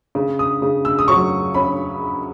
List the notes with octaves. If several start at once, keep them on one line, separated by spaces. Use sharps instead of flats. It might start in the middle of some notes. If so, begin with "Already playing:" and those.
C#3
D#6
C#3
E6
D#6
F#3 C#6
C#4 B5